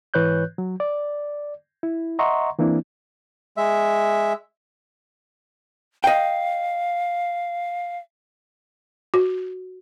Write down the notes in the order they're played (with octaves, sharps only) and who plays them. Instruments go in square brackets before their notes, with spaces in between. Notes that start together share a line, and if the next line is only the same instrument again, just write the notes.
[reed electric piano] G#2 E3 B4 C#5 F#6 G6
F#3
D5
E4
D#5 E5 F#5 A#5 C6 C#6
E3 A#3 C4 D4 E4
[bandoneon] G#3 E5
[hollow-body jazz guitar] D#5 G5 [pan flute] F5
[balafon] F#4